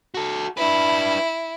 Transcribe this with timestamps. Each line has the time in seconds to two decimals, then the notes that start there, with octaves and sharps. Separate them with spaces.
0.14 F#4 A4
0.57 D4 E4 B4